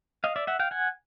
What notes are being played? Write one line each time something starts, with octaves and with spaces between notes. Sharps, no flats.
D#5 F5
D5 E5
E5 F#5
F5 G5
F#5 G#5